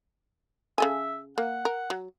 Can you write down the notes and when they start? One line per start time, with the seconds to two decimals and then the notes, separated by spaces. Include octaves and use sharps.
0.78 C#3 A4 E5 G#5
1.38 A#3 F#5
1.65 A#4
1.90 F#3